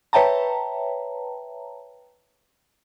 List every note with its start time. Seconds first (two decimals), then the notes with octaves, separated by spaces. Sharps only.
0.13 B4 C#5 E5 G5 A5 A#5